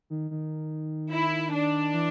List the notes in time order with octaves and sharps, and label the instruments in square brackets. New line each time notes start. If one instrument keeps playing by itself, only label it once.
[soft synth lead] D#3
D#3
[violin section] E4
D4
[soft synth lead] E3